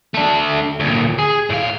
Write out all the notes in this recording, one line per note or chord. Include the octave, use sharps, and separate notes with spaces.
A3 D4
D2 A#2
G#4
A2 F5